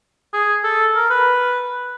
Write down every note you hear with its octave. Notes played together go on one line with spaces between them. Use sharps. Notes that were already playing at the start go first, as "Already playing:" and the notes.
G#4
A4
A#4
B4